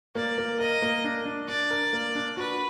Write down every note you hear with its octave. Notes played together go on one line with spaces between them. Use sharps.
A#3 D5
A#3
A#4 D#5
A#3
D4
D4
D4 D5
A#4
A#3
D4
F#4 B4